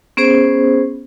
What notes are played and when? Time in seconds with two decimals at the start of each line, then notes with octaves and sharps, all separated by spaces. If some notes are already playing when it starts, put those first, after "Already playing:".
0.17 B3 C#4 G#4 C5